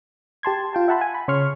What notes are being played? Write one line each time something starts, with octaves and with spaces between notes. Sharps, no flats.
G4 A5 C6 G#6
F4 G5 A5
E5 F#5 A5 B5 C6
G#5
B5
C#3 C#5 C6 C#6 F6